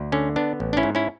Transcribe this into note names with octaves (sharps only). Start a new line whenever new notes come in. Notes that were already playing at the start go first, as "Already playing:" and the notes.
Already playing: D2
D3 C#4
B3 D4
A1
D4
C#4 E4
G#2
C#4 E4